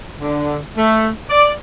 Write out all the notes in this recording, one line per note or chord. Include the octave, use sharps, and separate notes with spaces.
D3
A3
D5